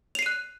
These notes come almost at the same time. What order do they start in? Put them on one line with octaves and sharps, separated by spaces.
F7 C7 D#7 F#6